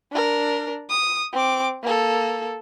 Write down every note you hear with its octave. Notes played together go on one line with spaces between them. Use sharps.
D4 A#4
D#6
C4 D6
A#3 A4